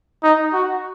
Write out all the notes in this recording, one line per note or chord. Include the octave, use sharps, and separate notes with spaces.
D#4
F#4